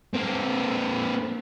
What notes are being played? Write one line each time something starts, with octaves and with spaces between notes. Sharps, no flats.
A#3 C4